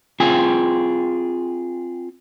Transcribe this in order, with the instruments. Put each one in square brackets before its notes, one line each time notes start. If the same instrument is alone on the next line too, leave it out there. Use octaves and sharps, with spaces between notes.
[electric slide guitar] C4 F4 G#4 G5 G#5